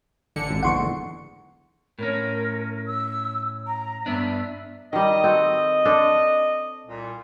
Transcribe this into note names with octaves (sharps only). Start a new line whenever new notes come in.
A1 D3 C#7
G#1
F#1 E2 G#2 F#5 C6 C#6
A2 C#4 A#4
E6
A#5
G2 B3 D4 E5
D#3 G3 D#5
C4 F#4 A4
D4 A4 C5
C2 A#2